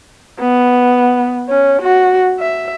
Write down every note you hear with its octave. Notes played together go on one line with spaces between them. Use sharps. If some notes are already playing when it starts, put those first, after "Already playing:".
B3
C#4
F#4
E5